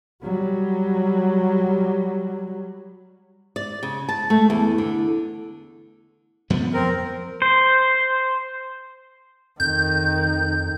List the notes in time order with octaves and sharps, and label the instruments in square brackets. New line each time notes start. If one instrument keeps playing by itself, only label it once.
[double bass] F#3 G3
[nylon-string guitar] D5
C#3
A5
A3
E2
D3
[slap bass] F2 F3 B3
[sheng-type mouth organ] C4 A#4
[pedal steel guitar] C5
[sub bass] F2 [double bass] D#3 [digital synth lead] G6